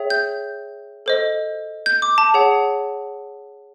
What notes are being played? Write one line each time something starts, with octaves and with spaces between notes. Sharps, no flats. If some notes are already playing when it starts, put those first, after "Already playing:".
Already playing: G#4 C#5 E5 G5
G6
A4 C5 D#5
G6
D6
A5
G#4 C#5 F#5